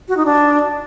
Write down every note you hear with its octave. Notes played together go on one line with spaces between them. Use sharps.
F#4
D#4
D4